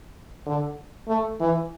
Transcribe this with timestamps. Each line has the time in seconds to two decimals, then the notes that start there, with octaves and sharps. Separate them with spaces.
0.46 D3
1.08 A3
1.40 E3